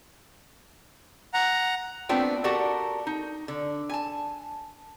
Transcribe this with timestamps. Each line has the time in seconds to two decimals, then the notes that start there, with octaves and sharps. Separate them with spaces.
1.34 F#5 A#5
2.09 A3 B3 C4 D4 F4 G5
2.44 F#4 G4 A4 A#4 D5 F#5
3.07 D#4
3.48 D3
3.90 G#5 A5